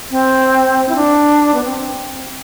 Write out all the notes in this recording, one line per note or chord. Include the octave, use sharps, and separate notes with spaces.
C4
E4
D4
B3
C4